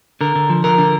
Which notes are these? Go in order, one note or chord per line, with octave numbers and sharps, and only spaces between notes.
D3 A#4
D3
F3
D3 A#4
D3